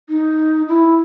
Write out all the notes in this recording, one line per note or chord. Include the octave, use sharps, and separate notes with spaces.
D#4
E4